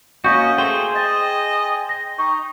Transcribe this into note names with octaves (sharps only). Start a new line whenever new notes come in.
A#3 C#4 F#4 D#5 F5 C#6 G6
A3 G#4 C5 G5
D#5 A6
A#6
D#4 C#6